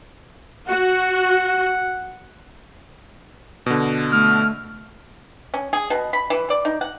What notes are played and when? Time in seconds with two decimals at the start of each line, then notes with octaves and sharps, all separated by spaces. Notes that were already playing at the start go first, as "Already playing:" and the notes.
0.68 F#4 F#5
3.66 B2 D3
4.12 A3 F6
5.54 C#4
5.73 G#4
5.90 B2
6.13 B5
6.30 E3
6.50 D5
6.65 D#4
6.81 F#5